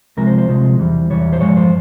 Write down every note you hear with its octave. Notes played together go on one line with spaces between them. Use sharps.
C2 C3 F3 G#3 A#4
C5
C5
C2 C3 F3 G#3
E2 E3 G3
E2 E3 G3 C#5
C5
G2 F3 G#3 C#5
C5